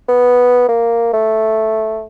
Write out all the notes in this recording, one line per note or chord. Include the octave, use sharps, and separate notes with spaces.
B3
A#3
A3